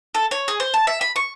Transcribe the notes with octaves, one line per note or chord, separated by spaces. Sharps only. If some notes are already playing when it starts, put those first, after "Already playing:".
A4
C#5
G#4
C5
A5
E5
B5
C#6